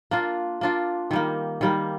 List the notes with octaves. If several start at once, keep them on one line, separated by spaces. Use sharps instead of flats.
A#3 D4 F4
A#3 D4 F4
D#3 G3 A#3
D#3 G3 A#3